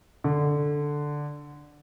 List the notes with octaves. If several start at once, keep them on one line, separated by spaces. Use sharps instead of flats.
D3